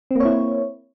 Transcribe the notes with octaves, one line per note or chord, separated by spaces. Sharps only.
A#3 C4 E4 C#5